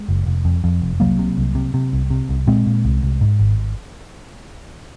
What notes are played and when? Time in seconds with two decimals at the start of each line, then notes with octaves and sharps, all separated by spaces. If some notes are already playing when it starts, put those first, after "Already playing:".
Already playing: G#3
0.09 F#1
0.26 F1
0.45 F2
0.64 F2
0.82 F1
1.00 C2 F#3 A#3
1.19 C3
1.38 C2
1.55 C3
1.74 C3
1.93 C2
2.10 C3
2.29 C2
2.47 A#2 G#3 C4
2.67 A#2
2.85 C2
3.03 C2
3.21 G#2
3.39 G#1